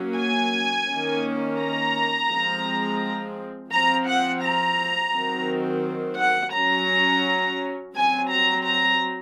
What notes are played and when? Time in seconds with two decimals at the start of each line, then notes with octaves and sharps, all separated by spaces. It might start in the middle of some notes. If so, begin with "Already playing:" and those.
Already playing: F#3 A#3 C#4
0.17 G#5
0.88 D#3 A#3 C#4
1.59 A#5
2.29 F3 G#3 C4
3.71 F3 C4 A#5
4.07 F#5
4.42 A#5
5.13 D#3 F#3 C4
6.19 F#5
6.54 F#3 C#4 A#5
7.96 F#3 C4 G#5
8.31 A#5
8.66 A#5